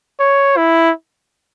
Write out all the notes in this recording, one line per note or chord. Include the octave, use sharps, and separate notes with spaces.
C#5
E4